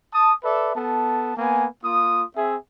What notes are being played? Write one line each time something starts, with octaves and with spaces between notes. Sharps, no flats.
A5 D#6
A4 B4 D5 E5
B3 A4 A5
A#3 B3 G#5
A#3 F4 D#6
C4 G#4 E5